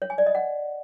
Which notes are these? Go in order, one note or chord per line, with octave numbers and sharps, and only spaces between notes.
C#5
G#5
D5
D#5
F#5